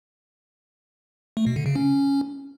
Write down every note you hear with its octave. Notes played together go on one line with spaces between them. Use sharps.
A3
B2
D3
C#3
C#4